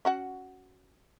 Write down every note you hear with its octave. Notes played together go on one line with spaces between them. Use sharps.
C#4 F#4 F#5